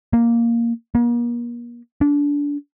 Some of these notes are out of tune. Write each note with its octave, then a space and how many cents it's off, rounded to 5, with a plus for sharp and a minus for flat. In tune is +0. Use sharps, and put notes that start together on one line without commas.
A#3 +0
A#3 +40
D4 -25